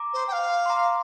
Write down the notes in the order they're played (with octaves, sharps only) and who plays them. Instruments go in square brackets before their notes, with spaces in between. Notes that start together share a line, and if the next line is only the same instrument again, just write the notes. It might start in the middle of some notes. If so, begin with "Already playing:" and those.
Already playing: [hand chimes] A#5 D6
[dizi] C5
G5
F5
[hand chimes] C6
A#5 D6